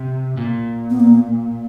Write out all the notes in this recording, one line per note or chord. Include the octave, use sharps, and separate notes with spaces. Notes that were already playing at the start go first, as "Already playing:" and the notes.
Already playing: C3
A#2
B3
A#3